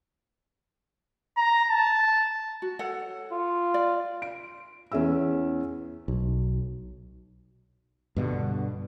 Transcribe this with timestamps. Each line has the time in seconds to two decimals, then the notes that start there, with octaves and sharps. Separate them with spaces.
1.37 A#5
1.70 A5
2.62 F#4
2.79 A4 C#5 F#5
3.32 F4
3.74 D5
4.22 D7
4.92 E2 C#4 G#4 E5 E6
6.08 B1
8.16 G2 B2 D3